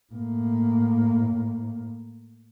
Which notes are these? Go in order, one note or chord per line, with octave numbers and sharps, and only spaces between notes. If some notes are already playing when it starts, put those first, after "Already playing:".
A2 A#3